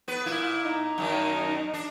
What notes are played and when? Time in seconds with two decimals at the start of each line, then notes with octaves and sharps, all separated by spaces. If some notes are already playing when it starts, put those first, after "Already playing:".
0.08 B3 B4
0.26 A#2 E4
0.65 D#4
0.98 F#2 D#3
1.74 D4